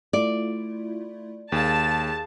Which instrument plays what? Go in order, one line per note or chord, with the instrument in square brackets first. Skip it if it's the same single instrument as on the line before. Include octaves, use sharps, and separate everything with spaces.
[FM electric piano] A3 E4 F4 [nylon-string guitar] D5
[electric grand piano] D#2 [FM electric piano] G#4 F5 [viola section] A5